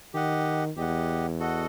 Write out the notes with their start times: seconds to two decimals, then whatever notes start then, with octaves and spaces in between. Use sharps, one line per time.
0.14 D#3 G4 D#5 F#5
0.77 E2 G4 D#5 F#5
1.39 F#4 A4 D#5 F#5